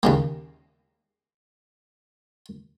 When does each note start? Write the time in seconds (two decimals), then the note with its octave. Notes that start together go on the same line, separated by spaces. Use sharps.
0.03 D#2 C#3 A#3